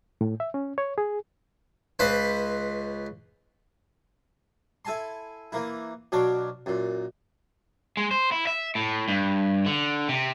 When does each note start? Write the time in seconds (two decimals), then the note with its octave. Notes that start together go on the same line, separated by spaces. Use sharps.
0.21 A2
0.40 E5
0.54 C#4
0.78 C#5
0.98 G#4
1.99 C#2 B4 C5
4.85 E4 A4 G#5 A5 C6
5.52 E3 A#3 E4
6.12 B2 F#3 D4 C#5 F5 D6
6.66 F#2 A#2
7.97 G#3
8.11 C5
8.32 E4
8.47 E5
8.75 A2
9.08 G2
9.66 D3
10.09 C3